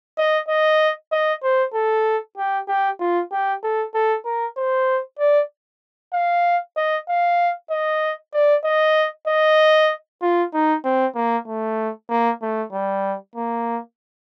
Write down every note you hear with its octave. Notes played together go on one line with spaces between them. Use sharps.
D#5
D#5
D#5
C5
A4
G4
G4
F4
G4
A4
A4
A#4
C5
D5
F5
D#5
F5
D#5
D5
D#5
D#5
F4
D#4
C4
A#3
A3
A#3
A3
G3
A#3